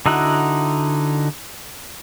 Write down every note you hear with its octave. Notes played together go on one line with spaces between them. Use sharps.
D3 D#4 E4 F#4 F#5